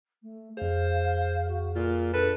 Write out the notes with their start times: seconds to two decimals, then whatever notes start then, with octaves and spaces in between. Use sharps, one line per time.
0.22 A3
0.57 F2 G#4 C5 F5
1.48 F#4
1.75 A#2 F4 A4
2.13 D4 A4 B4